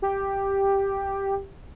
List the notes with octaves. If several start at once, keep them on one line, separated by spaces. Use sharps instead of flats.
G4